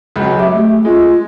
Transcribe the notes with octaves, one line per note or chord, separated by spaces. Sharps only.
C#2 F#3
G4 E5
A3
G#3 F4